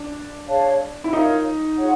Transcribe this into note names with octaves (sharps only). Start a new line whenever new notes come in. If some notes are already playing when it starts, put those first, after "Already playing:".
Already playing: D4
G#4 C#5 F5 A5
E4
D#4 F4 A#4 C#5 F5
F4 G#4 C#5 F#5